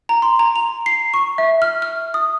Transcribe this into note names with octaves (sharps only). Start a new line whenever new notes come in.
A#5
C6
A#5
F7
C7
C#6
E5
F6
F6
D#6